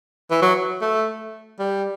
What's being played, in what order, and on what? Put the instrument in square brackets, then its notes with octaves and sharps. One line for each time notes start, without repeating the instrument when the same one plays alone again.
[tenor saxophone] E3
F#3
A3
G3